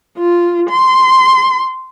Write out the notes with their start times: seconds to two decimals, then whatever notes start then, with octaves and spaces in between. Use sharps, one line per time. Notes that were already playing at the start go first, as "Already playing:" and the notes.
0.19 F4
0.70 C6